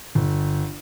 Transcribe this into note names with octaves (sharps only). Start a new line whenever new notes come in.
G1